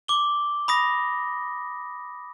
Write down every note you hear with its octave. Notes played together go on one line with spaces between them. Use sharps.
D6 G7
B5 D#6 A#6